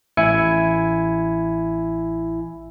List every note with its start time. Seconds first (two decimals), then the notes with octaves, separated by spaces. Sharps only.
0.17 A1 E4 G#5 C#7